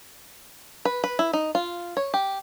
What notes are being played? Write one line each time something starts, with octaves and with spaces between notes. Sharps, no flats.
B4
B4
E4
D#4
F4
C#5
G4